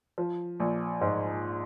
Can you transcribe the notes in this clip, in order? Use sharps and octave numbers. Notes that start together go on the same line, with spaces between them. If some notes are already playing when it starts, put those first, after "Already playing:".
F3
A#1
G#2